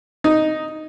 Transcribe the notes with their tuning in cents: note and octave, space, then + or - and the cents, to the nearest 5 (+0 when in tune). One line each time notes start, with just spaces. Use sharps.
D#4 +0